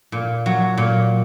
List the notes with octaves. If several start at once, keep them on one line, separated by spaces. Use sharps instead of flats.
A#2
F#3
A#2